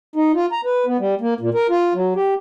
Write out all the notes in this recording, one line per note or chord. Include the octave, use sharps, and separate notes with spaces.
D#4
F4
A#5
B4
B3
G3
A#3
A#2
A#4
F4
F#3
G4